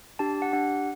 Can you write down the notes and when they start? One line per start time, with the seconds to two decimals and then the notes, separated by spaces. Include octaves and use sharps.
0.19 D4 G4 A5
0.42 F#5
0.53 D4 G4 F#5